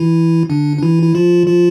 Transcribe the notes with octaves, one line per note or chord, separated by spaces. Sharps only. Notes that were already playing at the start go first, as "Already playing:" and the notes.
Already playing: E3 E4
D3 D4
D4
E3 E4
E4
F3 F4
F3 F4